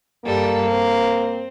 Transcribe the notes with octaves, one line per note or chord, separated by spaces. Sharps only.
G2 G3 A#3 A4
C4